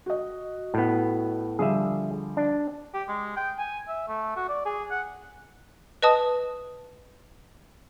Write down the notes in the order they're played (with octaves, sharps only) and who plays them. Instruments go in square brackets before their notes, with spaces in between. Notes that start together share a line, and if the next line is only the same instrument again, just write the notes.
[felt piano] F#4 D#5
[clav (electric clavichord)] A2 B3
[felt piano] D3 F3 G3 [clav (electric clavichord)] G#4 E5
[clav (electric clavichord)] D4
[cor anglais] G4
G#3
G5
G#5
E5
A3
F#4
D5
G#4
F#5
[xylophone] B4 D#5 A5 D#6